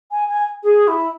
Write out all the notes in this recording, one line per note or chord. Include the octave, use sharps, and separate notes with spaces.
G#5
G#5
G#4
E4